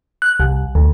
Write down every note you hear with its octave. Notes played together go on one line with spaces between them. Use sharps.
F#6
C2
D2